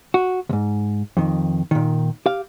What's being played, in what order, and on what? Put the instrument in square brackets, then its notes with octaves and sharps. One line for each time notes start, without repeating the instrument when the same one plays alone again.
[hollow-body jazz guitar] F#4
D2 G#2
F2 D#3
A#2 D#3
G4 F5